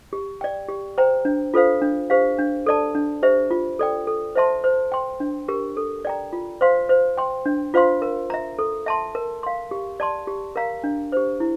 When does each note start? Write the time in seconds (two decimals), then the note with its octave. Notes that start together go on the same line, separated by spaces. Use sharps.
0.13 G4
0.41 D5 G5
0.69 G4
0.98 C5 G5 A#5
1.25 D4
1.54 F4 A4 C5 F5
1.82 D4
2.10 G4 C5 F5
2.39 D4
2.66 A4 D5 A5
2.95 D4
3.23 G4 C5 E5
3.51 F4
3.79 A4 D5 G5
4.07 A4
4.36 C5 E5 A5 C6
4.64 C5
4.92 G5 C6
5.20 D4
5.48 G4 A#4
5.77 A4
6.05 D5 G5 A#5
6.33 F4
6.61 C5 F5 C6
6.89 C5
7.17 G5 C6
7.46 D4
7.74 F4 C5 F5 C6
8.02 A#4
8.30 E5 A#5
8.59 A4
8.86 E5 A5 C6
9.15 A#4
9.43 F5 C6
9.71 G4
10.00 D5 A5 C6
10.27 G4
10.56 A#4 F5 A#5
10.84 D4
11.12 G4 C5
11.40 E4